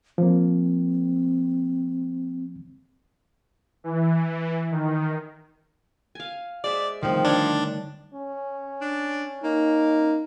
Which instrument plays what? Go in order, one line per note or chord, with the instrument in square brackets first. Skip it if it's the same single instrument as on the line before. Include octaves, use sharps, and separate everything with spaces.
[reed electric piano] F3 A#3 [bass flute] C4
[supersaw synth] E3
D#3
[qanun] F5 G#5
[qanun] G#3 C5 E5 [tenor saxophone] D5
[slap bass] D3 G3 A3 [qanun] D#3 C4 [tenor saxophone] F3
[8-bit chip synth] D4 [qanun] C#5 A5
[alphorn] C#4
[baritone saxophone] D4
[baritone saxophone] A#3 [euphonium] D#4